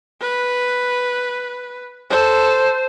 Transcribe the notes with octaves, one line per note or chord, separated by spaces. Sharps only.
B4
A4 C5